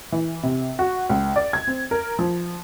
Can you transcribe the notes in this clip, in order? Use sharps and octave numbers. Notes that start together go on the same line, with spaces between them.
E3
C3
F#4
C#2
D5
G#6
C4
A#4
F3